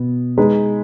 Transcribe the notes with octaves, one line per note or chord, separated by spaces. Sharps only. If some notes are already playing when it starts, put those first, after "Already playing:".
Already playing: B2 B3
G#3 D#4 G#4 B4